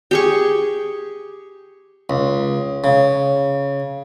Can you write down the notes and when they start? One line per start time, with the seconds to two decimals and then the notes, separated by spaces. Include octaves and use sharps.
0.11 G4 G#4 C#6
2.10 C#2
2.84 C#3